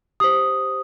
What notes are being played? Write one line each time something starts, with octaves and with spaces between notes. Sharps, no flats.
G4 C5 D#6